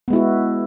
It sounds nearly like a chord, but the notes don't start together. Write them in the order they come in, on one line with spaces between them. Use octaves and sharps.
B3 G#3 E4 F#4